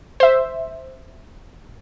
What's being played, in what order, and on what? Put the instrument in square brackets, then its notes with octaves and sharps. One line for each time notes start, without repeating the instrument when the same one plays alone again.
[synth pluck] C5 E5